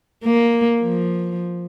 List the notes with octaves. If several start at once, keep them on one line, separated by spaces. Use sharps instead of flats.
A#3
F3